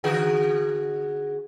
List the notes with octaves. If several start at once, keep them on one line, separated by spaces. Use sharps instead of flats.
D3 F#4 G#4